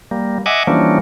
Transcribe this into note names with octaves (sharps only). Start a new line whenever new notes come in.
G3 A#3
D#5 E5 F#5 G#5 D6
E3 F3 G3 A#3 C#4 D4